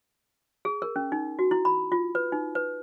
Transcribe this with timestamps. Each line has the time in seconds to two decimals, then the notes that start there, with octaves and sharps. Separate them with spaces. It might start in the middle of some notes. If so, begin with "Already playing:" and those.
0.65 G#4
0.82 A#4
0.96 C#4
1.12 D#4
1.39 F#4
1.51 E4
1.65 B5
1.92 F4
2.15 B4
2.32 D#4
2.55 B4